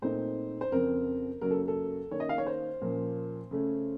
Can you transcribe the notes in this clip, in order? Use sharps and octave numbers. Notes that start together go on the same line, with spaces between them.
A#2 A3 C4 D#4 C5
C5
F2 C#3 F3 C4 A#4
F#2 C#3 F#3 A#3 A#4
A4
A4
D#3 A#3 C#4 C#5
D#5
F5
C#5
C5
A#2 F3 A#3 C#4
C#3 A3 C#4